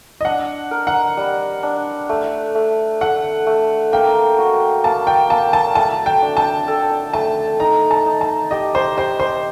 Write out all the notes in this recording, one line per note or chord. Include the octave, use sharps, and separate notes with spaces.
D#5
D4 F#5
A#4
F#5
G3
D4
A3
A3
A3 F#5
A3
A#3 G5
F#4
A#3 A5
G5
A#3 A5
A5
A3 A5
G5
D4
A5
A4
A3 A5
D#4 A#5
A5
D#4
A5
G4 D#5
C5
G4 C5
C5